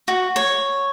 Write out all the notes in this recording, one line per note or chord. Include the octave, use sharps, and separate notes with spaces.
F#4
C#5